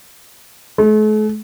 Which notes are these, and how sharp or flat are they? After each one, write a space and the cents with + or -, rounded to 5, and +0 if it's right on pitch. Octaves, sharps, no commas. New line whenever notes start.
A3 -45